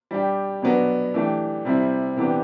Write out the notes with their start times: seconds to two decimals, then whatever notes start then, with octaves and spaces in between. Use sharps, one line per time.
0.11 G3 D4 G4
0.62 B2 F#3 B3 D4
1.14 E3 A3 D4 G4
1.65 C3 G3 C4 E4
2.16 C3 E3 B3 D4 G4